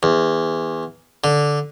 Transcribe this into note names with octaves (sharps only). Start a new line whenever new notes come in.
E2
D3